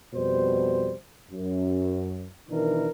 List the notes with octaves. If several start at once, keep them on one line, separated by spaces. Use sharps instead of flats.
F2 B2 G3 C5
F#2
B2 D#3 E3 D4 A#4